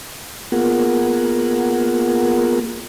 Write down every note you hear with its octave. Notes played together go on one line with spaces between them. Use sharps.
A#3 B3 F4 G#4 A#4 F#5